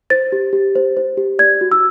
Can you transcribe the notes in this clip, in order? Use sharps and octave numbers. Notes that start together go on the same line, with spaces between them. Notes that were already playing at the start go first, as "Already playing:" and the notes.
C5 A6
G4
G4
C5
C5
G4
D5 G#6
F#4
E6